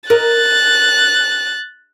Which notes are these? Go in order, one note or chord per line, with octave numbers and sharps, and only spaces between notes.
A#4 D#5 F#6 A6